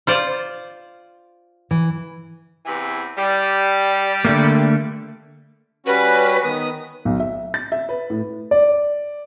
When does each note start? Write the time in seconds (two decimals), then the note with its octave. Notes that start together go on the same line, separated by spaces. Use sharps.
0.07 F4 C5 D5
1.71 E3
2.65 E2 C3 E3
3.17 G3
4.25 D3 A3 A#3
5.86 G3 C#4 F#4 B4
6.44 D#3 B3 D#6
7.05 B1
7.20 E5
7.54 A6
7.72 E5
7.89 B4
8.10 A2
8.51 D5